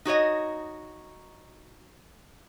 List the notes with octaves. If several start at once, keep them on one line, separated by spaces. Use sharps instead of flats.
D#4 F#4 C#5 D#5